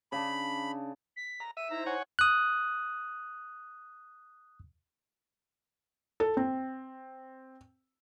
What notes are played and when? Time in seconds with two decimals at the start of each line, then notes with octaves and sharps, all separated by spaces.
0.12 C#3 D4 B5
1.16 B6
1.40 A#5
1.57 E5 D#7
1.70 D#4 E4 C5 A#5
1.86 C#5 F#5 G#5
2.19 D#6 F#6
6.20 A4
6.37 C4